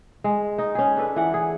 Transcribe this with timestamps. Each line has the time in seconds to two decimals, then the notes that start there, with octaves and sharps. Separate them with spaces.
0.24 G#3
0.58 D#4
0.75 C#4 G#4
0.97 D4 A4 B4
1.16 E3 F#5
1.34 G#4